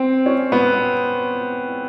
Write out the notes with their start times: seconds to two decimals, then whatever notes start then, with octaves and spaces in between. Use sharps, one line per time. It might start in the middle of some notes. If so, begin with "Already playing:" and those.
Already playing: C4
0.26 C#4
0.52 B3